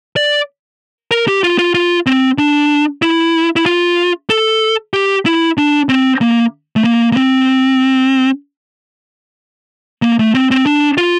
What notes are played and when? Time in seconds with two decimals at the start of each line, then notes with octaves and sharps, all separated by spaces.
0.16 D5
1.11 A#4
1.28 G4
1.44 F4
1.59 F4
1.74 F4
2.06 C4
2.38 D4
3.02 E4
3.56 E4
3.66 F4
4.30 A4
4.94 G4
5.26 E4
5.58 D4
5.89 C4
6.21 A#3
6.76 A3
6.84 A#3
7.12 A#3
7.17 C4
10.02 A#3
10.19 A3
10.34 C4
10.51 C4
10.66 D4
10.98 F4